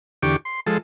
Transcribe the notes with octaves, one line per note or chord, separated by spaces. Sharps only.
E2 D3 G4 C#6 D6
C6
F3 G#3 A4